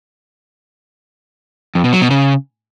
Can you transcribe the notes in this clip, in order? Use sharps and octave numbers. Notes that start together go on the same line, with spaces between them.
F2
B2
F#3
B2
C#3